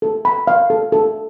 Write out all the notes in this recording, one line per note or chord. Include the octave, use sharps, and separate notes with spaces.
A4
B5
F5
A4
A4